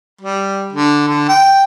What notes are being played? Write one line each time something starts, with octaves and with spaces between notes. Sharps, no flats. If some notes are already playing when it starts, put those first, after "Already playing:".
G3
D3
D3
G5